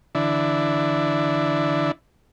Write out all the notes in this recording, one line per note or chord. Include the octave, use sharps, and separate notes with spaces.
D3 E3 D4 E4